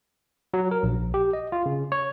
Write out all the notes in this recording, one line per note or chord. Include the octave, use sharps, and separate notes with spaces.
F#3
A#4
A#1
G4
D#5
F4
C#3
C#5